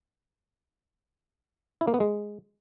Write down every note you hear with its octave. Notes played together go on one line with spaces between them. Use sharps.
E4
A#3
B3
G#3